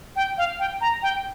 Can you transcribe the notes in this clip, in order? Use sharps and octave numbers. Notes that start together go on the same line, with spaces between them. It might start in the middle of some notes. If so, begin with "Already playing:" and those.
G5
F5
G5
A#5
G5